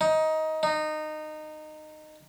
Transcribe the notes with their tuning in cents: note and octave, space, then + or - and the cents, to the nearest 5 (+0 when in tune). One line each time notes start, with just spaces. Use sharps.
D#4 +15
D#4 -20